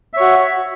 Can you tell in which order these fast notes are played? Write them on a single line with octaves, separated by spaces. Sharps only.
E5 C#5 F#4